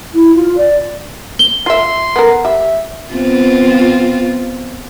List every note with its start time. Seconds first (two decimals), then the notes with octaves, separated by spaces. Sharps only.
0.14 E4
0.34 F4
0.57 D5
1.39 G7
1.66 F4 E5 C6
2.16 B3 A#4
2.45 G3 E5
3.13 B3 C4 F4